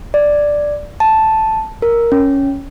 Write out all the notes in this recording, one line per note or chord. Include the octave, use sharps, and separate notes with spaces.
D5
A5
A#4
C#4